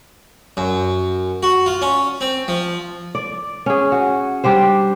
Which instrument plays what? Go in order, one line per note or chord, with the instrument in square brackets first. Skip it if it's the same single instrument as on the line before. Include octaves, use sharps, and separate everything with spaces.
[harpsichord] F#2
F#4
F4
C#4
C4
F3
[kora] D5
C#4 G#4
F#4
G3 D4 G4 C5